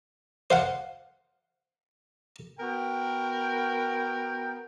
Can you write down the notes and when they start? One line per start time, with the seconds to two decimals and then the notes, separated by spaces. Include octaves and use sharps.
0.50 C5 F5 F#5
2.60 B3 F#4 A#4 G5